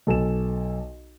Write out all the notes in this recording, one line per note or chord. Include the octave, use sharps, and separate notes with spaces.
B1 A4 G#5 E7